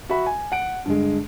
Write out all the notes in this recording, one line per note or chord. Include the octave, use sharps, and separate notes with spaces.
F#4 E5 B5
G#5
F#5 D7
G2 D3 G#3